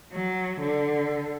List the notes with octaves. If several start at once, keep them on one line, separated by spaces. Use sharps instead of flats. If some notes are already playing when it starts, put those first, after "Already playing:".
F#3
D3